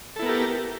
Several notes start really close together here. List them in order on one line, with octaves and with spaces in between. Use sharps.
A4 E4 B3 A#4 G4